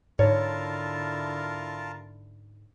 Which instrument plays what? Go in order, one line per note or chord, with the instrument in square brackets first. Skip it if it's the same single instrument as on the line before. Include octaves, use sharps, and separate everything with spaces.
[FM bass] G#2 [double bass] D3 E4 [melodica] F4 A#4 A5 [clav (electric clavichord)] C#5